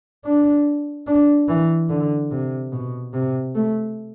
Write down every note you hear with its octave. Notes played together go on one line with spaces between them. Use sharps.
D4
D4
E3
D3
C3
B2
C3
A3